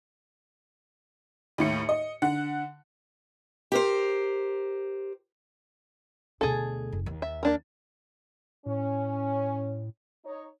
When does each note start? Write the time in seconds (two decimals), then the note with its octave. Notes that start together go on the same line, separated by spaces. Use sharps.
1.58 D#2 A2 C#7
1.89 D#5
2.22 D3 F#5
3.72 G4 A#4 C5
6.41 D2 B2 G#4 A4
6.92 F#1
7.06 D#2
7.22 E5
7.43 A#3 D4 A#4
8.66 A2 C#4
10.26 D#4 C#5